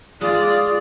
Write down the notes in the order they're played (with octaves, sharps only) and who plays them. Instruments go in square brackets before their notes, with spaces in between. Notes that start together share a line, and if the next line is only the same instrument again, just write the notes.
[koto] G#3 [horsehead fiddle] F4 [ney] D5 [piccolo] D#6